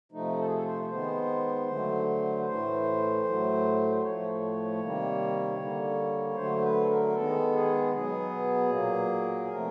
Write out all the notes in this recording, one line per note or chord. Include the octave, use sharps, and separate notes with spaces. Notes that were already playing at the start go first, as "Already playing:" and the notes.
C3 F3 A3 D#4
A4
G#4
A4
C5
D#3 G#3 B3 C5
D3 F#3 A3
B4
A2 E3 A3 C5
A2 F#3 A3
C5
A2 F3 A3 C#5
C3 D#3 G3 A#3
D3 G3 A#3
D3 F#3 A3 C5
B4
A4
A#4
D#3 G#3 B3 A4
G#4
B2 F#3 B3 G#4
A#2 F#3 A#3
C3 F3 A3 A#4